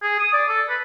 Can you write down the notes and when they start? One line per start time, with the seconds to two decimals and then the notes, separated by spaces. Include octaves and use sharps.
0.02 G#4
0.19 D#6
0.33 D5
0.48 A4
0.69 B4